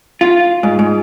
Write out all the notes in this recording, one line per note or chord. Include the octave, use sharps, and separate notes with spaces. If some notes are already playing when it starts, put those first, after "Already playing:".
F4
G#2
G#2